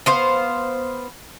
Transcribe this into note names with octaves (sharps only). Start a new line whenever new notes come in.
B3 C5 F5